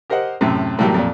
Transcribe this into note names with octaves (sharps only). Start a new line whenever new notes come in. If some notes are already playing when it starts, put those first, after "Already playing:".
G4 A#4 C5 D#5 F#5
F#2 A2 C3
A2 E3 F#3 G3 A#3
F2 A#2